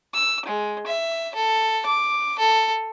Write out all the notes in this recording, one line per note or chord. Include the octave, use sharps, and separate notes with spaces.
E6
G#3
E5
A4
D6
A4